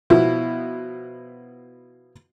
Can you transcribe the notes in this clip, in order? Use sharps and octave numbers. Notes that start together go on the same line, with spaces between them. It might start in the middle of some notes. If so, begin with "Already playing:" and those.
B2 F3 B3 E4